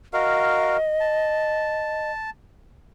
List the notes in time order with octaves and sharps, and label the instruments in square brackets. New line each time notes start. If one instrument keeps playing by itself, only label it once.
[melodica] F#4 A#4 F5 [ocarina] D#5
[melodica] A5